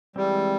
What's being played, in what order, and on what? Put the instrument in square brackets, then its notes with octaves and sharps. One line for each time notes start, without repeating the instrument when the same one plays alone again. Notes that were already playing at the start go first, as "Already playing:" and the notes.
[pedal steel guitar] E3 G#3 C4 [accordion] G3